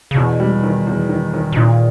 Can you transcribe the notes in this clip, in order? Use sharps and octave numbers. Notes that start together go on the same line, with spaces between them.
C#3
E2 B2
G3
D#3
E2
D#3
D#3
B2
A#2 D#4